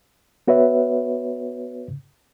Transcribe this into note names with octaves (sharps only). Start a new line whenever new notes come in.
B3 F#4 B4 C#5 E5